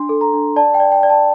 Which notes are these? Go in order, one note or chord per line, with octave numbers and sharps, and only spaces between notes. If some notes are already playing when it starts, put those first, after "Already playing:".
Already playing: D4 C6
A4
A#5
D4
D5 A5
G5
D5
G5
D5
A5